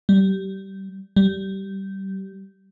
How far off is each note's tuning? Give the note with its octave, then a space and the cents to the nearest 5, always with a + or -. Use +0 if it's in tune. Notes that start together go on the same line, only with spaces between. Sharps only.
G3 -20
G3 -20